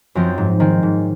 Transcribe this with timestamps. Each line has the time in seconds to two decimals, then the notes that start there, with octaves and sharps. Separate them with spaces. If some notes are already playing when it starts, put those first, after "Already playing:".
0.15 F#2 F3 C4
0.38 G#2
0.60 D#3 G#3 C4
0.83 G#2